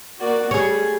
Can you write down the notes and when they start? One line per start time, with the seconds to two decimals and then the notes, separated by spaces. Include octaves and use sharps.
0.19 A#3 F#4 D5
0.51 G3 A3 G#4 C#5 G#5